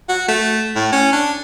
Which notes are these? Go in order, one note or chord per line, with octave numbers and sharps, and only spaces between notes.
F#4
A3
A2
C#4
D4